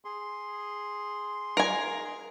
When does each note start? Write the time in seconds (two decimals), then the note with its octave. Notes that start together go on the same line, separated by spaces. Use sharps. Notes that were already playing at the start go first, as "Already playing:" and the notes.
0.05 G#4 C6
1.57 A#4 G#5